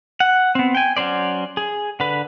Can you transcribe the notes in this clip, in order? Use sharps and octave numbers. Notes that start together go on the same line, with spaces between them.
F#5
B3 C4
G5 G#5
F#3 C#4 C5 D5
G#4
D3 B4